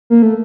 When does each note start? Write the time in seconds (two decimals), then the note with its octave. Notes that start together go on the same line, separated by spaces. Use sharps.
0.10 A#3
0.22 A3